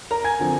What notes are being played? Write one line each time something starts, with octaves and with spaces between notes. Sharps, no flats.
A#4 A#5
G#5 G#6
D3 F3 C4